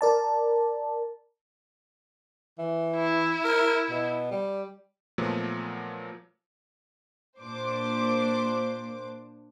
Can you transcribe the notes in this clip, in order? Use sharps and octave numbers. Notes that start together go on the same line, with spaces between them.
A#4 D5 A5
E3
E4
A#4
B2
G3
A#2 F3 F#3 A3 B3
A#2 D4 C5 D6